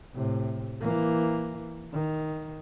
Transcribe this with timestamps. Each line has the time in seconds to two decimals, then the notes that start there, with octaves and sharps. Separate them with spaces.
0.15 A2 C3
0.81 E3 A#3
1.93 D#3